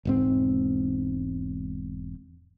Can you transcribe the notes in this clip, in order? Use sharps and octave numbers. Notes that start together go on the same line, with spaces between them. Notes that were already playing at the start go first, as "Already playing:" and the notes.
E1 G#2 C4